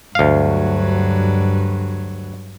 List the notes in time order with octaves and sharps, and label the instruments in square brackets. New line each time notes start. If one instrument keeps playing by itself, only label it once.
[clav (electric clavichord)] D2 F5 [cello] G2 F#3